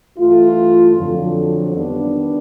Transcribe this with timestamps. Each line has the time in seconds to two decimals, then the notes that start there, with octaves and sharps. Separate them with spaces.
0.17 G2 E3 A3 F4
0.96 F2 D3 F#3
1.74 D#3 G3 B3 D4